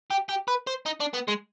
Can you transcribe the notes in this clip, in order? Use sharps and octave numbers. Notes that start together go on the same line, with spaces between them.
G4
G4
B4
C5
D#4
D4
B3
G#3